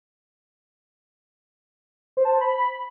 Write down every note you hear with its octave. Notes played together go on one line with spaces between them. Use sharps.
C5
A5
C5
B5